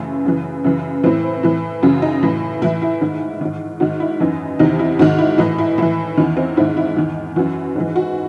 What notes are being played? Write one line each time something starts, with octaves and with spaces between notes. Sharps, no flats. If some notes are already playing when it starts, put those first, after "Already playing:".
Already playing: F#2 C#3 E3 A3
F#2 C#3 E3
F#2 C#3 E3
A2 E3 C4
A2 E3
F#2 C#3 E3 F#4
D#4
A2 E3
A2 E3 E4
E4
G#2 D#3
G#2 D#3
G#2 D#3 F#4
E4
F#2 E3 D#4
E2 C3 D#3 D#4
E4
G#2 D#3 F#4
E4
A2 E3 D#4
E4
A2 E3 E4
E2 D#3 C#4
C4
G#2 D#3 E4
E4
E2 D#3
F#2 E3 F#4
G#2 E3
F#4